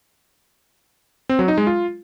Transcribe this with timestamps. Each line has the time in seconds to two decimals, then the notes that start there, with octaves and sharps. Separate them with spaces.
1.29 C4
1.39 F#3
1.48 D#4
1.58 G#3
1.67 F4